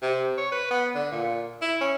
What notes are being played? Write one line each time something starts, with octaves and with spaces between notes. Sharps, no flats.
C3
C#5
B4
B3
D3
A#2
E4
C#4